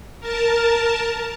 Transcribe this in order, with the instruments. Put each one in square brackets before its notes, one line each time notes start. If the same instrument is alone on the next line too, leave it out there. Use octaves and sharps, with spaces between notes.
[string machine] A#4 A5